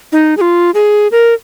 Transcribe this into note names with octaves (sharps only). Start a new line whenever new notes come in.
D#4
G#4
F4
G#4
A#4